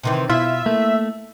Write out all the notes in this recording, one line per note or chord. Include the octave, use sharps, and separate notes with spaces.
C3 D#3 E3
B2 E4 F4 E5
A3 A#3